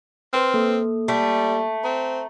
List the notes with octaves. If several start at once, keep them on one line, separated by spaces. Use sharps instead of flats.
C4 B4 C6 F6
A#3 A4
G3 A3
C4 A#5